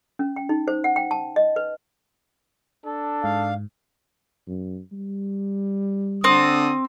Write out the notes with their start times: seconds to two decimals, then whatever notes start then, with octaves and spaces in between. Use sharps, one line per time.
0.19 C#4
0.36 G5
0.49 D#4
0.68 C5
0.84 F#5
0.96 G5
1.11 A5
1.36 D#5
1.56 B4
2.86 D4 A4
3.24 G#2 F5
4.47 F#2
4.92 G3
6.24 D3 C4 D#6